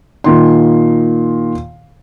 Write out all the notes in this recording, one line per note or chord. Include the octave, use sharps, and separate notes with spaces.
A#2 D#3 C6